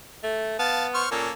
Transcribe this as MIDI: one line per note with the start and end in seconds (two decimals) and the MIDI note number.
0.23 0.56 57
0.59 1.04 59
0.59 0.86 77
0.59 0.86 81
0.94 1.09 72
0.94 1.09 85
0.94 1.09 89
1.11 1.27 46
1.11 1.32 58
1.11 1.32 61
1.11 1.32 69